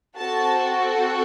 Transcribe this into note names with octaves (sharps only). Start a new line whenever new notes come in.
C4 F#4 A4 A5